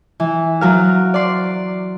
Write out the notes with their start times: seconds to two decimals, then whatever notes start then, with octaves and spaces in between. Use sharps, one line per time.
0.20 E3
0.61 F#3 A#4 F5
1.14 D5 C6